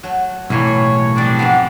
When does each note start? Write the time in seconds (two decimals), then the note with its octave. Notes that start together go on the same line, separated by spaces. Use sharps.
0.03 F#3 A3
0.50 B1 A2 E3 G3 A#3 C#5
1.16 A#2 F3 G3 C4 D4
1.39 G#2 A3 B3